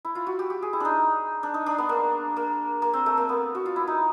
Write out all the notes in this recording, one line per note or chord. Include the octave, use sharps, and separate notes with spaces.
E4
F4
F#4
G4
G4
G#4
E4
D4 D#4
D4
D#4
D4
B3
A#3
A#3
A#3
C4
A3
A#3
B3
F#4
F4
E4
D#4